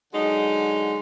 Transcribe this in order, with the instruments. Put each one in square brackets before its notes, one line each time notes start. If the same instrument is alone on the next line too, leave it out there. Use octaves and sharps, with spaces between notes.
[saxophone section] D3 F#3 G#3 D#4